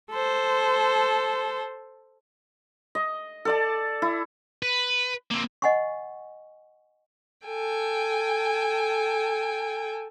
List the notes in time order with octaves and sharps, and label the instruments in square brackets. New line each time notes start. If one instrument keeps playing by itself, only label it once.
[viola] A4 C5
[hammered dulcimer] D#5
A4 D5 A5
E4
[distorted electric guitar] B4
A#3 C4
[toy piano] D#5 F#5 G#5 B5 C#6
[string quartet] A4 G5 G#5